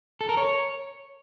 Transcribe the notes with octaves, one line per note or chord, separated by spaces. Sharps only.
A4
A#4
C#5